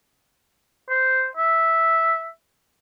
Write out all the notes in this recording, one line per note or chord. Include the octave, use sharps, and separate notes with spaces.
C5
E5